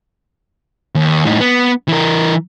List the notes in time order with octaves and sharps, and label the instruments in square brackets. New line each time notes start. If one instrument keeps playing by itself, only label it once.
[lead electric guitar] D#2
A2 D#4
B3
E3 A#4